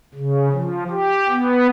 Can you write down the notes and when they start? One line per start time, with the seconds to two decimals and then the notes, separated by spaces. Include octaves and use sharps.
0.14 C#3
0.52 F3
0.90 G4
1.29 B3